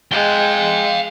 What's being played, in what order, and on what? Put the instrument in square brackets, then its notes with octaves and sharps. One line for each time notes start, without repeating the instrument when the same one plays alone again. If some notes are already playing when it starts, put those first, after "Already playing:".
[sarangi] G#3 [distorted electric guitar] F5 G5